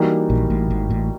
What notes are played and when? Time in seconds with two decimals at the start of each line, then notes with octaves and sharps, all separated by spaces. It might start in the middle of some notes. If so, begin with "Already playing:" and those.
Already playing: E3 G3 A#3 D#4 F#4
0.30 A#1 A#2
0.50 A1 A2
0.70 G#1 G#2
0.90 A1 A2